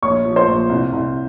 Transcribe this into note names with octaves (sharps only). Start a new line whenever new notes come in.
A#1 C#5 C#6
F3
C5 C6
A#1
C2
C2